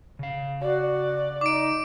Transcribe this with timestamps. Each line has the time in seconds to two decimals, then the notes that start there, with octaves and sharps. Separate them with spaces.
0.19 C#3 F5
0.61 F#4 D5
1.41 D#4 D6 D7